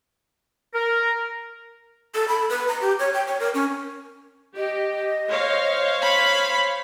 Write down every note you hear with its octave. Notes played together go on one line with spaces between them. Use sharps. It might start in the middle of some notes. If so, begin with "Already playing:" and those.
A#4
A4
B5
B4
A#5
G4
C#5
G5
C#5
A#4
C#4
G4 D#5
C5 C#5 F5
B5